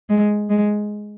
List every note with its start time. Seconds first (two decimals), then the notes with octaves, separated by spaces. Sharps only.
0.09 G#3
0.50 G#3